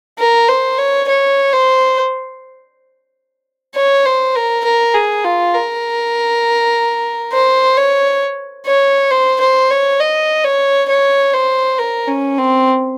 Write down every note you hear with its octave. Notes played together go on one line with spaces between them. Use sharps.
A#4
C5
C#5
C#5
C5
C#5
C5
A#4
A#4
G#4
F4
A#4
C5
C#5
C#5
C5
C5
C#5
D#5
C#5
C#5
C5
A#4
C#4
C4